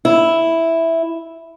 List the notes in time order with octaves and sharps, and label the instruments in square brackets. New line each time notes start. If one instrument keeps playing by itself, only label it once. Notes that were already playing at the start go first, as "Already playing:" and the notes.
[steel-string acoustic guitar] E4